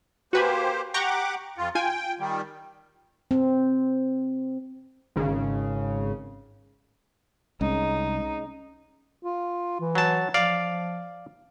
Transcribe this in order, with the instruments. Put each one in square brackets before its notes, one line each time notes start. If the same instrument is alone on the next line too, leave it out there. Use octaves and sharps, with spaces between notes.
[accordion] A#3 G4 C5 [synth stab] F#4 B4 G#5
[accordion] G4 F#5 D6 [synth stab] G5 A#5 C#6
[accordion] F2 F4
[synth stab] F4 G#5 [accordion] G5
[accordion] D#3 G3
[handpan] C4
[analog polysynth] G#1 C#3
[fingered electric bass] C2 [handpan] G#3 C#4 [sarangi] D#4
[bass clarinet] F4
E3
[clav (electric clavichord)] F#3 A5
[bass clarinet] F3 [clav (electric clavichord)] D5 F5